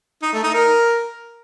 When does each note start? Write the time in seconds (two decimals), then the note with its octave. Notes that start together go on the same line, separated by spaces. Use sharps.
0.22 D#4
0.33 A3
0.43 D#4
0.54 A#4